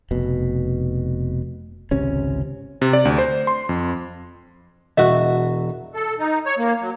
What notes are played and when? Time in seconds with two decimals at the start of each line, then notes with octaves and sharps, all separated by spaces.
0.11 F1 B2
1.91 G#1 C#2 C3 C#4
2.82 C3
2.93 D5
3.05 D2
3.18 C5
3.47 C6
3.69 F2
4.97 E1 F#4 D#5 E5
5.95 A4
6.19 D#4
6.46 C#5
6.58 A#3
6.81 F#3